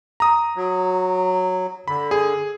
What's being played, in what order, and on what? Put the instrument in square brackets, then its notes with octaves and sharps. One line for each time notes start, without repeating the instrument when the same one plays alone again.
[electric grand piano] A#5 D#6
[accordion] F#3
[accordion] D3 [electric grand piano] B5
[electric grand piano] G#4